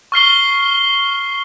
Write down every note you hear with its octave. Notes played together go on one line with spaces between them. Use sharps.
C#6 F6 C7 G7